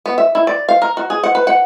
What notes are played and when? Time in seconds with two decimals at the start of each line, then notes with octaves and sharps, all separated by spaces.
0.06 B3
0.18 E5
0.35 E4
0.47 D5
0.69 F5
0.82 A#4
0.97 F#4
1.10 G#4
1.24 F#5
1.35 B4
1.47 F#5